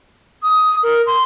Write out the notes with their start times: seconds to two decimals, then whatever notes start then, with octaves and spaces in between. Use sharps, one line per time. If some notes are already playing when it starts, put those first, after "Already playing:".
0.43 D#6
0.83 A#4
1.07 C6